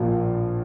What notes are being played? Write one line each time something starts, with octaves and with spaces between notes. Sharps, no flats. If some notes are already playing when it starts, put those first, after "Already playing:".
Already playing: A#1 A#2 F3